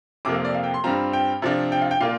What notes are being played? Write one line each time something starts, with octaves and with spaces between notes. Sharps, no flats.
F2 C3 F3 A#3 D6
F5
D5
F5
G5
C6
G2 G3 C4 F4 A#5
G5
C3 F3 D4 F4
G5
F5
G5
A#2 A#3 F4 F5